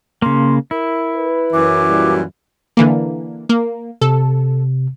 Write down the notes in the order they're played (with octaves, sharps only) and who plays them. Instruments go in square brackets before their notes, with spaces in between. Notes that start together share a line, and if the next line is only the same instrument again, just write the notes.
[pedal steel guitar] C#3 A#3 [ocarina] C6
[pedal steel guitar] E4 [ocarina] A#4
[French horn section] B4
[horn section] F#2 E3 [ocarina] D6
[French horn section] A#2 F#3 G3
[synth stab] D3 E3 A#3
A#3
[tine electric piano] C3 [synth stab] A4